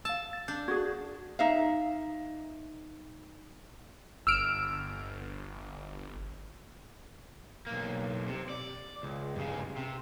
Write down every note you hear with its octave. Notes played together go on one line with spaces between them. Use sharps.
F5 A5 E6
A6
D4 G6
F#4 G#4 G#6
D#4 E5 F5
G1 E6 F6 D7
B1 A#3
C3
D5
C#2
G2 C#3
C3